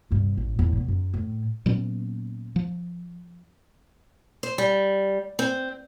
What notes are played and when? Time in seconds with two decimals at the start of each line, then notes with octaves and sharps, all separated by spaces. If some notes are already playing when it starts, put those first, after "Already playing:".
0.11 G2 C3
0.37 A1
0.59 E2 A2
0.73 B2 E3
0.88 F#2
1.14 A2
1.66 A#2 F#3 B3 C#4
2.56 F3
4.43 C5
4.58 G3
5.39 C4